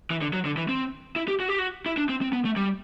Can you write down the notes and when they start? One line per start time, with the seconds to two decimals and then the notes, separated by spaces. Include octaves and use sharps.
0.10 E3
0.21 D3
0.33 F#3
0.45 D3
0.57 E3
0.69 C4
1.16 E4
1.28 G4
1.40 F#4
1.48 G4
1.58 F#4
1.86 E4
1.97 D4
2.09 C4
2.22 C4
2.33 B3
2.45 A3
2.56 G3